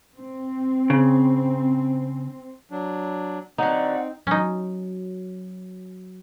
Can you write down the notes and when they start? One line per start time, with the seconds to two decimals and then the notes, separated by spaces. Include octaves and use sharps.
0.16 C4
0.90 C#3
2.71 F#3 D4
3.58 D3 F#3 C4 D#4 F#5
4.27 F#3 C#4 D#4